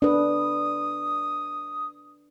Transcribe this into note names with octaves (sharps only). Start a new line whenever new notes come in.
D4 B4 D#6